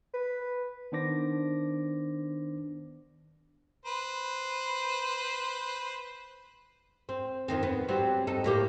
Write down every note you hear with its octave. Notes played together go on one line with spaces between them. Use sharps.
B4
D#3 B3 D4 C5 D6 A#6
B4 C5
C4
F2 D#3 C4
B3
F#3 G3 C4
D#4 A4
A2 A#3 G4